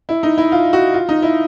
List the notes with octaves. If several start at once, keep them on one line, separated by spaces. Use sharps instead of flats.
E4
D#4
E4
F4
F#4
F4
D#4
E4